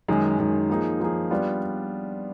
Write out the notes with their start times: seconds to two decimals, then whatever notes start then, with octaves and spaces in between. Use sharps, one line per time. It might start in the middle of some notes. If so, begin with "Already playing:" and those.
0.08 F#2 D#3 G#3
0.39 F#2 D#3 G#3
0.70 F3 A#3 D#4 G#4
1.00 F3 A#3 D#4 G#4
1.31 G3 B3 D4 F4